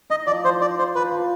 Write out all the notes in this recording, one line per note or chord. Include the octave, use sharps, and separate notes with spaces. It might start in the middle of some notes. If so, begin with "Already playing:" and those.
D#4 D#5
F3 D5
F3 C5
D#4 D5
D#4 C5
F3 B4
F3